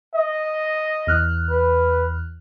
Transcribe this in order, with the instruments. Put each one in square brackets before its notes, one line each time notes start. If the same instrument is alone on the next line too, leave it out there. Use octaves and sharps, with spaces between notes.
[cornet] D#5
[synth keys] E2 F6 F#6
[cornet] B4